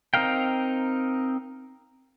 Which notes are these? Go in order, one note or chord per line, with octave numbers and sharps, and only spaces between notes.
C4 D#4 A#4 F5 G5